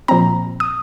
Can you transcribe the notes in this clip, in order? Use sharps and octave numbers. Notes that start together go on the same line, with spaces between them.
A#2 F3 C4 A#5
D#6